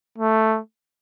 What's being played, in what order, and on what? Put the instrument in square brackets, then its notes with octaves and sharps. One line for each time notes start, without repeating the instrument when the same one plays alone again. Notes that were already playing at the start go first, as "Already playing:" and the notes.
[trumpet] A3